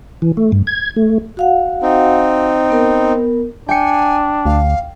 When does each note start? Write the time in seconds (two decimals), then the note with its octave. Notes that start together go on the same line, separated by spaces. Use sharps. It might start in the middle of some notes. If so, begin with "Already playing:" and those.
0.22 E3
0.37 A3
0.52 G2
0.67 G#6
0.96 A3
1.37 F#4 F5 F#5
1.82 C4 D#4
2.70 B3 A#4
3.69 D4 G5 G#5 C#7
4.45 D2 F5